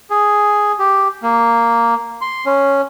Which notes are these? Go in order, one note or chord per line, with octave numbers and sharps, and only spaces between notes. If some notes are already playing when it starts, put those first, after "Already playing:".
G#4
G4
A#3
C6
C#4